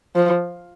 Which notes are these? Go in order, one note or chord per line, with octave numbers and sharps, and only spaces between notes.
F3